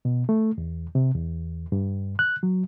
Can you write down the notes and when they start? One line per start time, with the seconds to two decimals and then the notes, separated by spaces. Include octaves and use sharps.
0.05 B2
0.29 A3
0.58 E2
0.95 C3
1.15 E2
1.72 G2
2.19 F#6
2.43 F#3